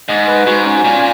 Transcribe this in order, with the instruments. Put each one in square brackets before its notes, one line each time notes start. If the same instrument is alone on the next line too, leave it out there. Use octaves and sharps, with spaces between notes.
[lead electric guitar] G#2 [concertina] D#5
[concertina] B4
[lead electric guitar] G#2 [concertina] F#4
[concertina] C#4
[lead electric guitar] A#2 [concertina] G#5